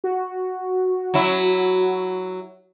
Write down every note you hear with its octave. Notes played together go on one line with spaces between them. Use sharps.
F#4
F#3 E4